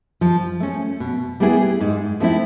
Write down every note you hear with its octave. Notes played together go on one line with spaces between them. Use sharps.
F3
A3 C#4
B2
G3 B3 E4 G#4
G#2
F3 A3 C4 E4